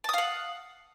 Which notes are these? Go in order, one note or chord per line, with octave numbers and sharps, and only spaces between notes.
F5 F#5 A5 D#6